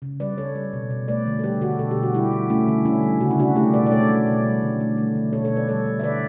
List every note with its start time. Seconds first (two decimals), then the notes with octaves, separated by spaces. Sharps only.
0.02 C#3
0.20 G3 B4 D5
0.38 C#3 A4 C#5
0.55 G3
0.73 B2
0.90 B2
1.08 A3 B4 D5
1.27 D3
1.39 A4
1.44 G3 G4 B4
1.61 D3 F#4 A4
1.79 B2 A4
1.91 G4
1.97 B2
2.03 F#4
2.14 G3 E4 G4
2.32 G3
2.50 A3 C#4 E4
2.68 D3
2.85 D3 C#4 E4
3.03 G3
3.21 C#3 F#4
3.31 E4
3.38 C#3 D4 F#4
3.56 A3 E4 G4
3.74 B2 B4 D5
3.86 D5
3.91 A3 A4 C#5
4.09 F#3
4.27 B2
4.45 G3
4.62 D3
4.80 A3
4.98 A3
5.15 D3
5.33 B2 A4 C#5
5.44 A4 C#5
5.51 B2
5.56 B4 D5
5.68 G3 A4 C#5
5.86 G3
6.00 E5
6.03 D3 B4 D5